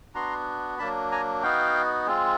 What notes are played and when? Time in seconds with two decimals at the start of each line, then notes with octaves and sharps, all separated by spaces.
0.15 B3 D4 F#4 A#5 C6
0.79 F#3 A#3 D4 A5 B5
1.12 G#5 A#5
1.43 B3 D#4 F#4 F5 G5
2.07 G#3 C4 F4